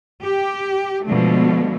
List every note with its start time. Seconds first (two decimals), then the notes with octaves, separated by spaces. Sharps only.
0.23 G4
1.05 B2 D3 F3 G#3 A3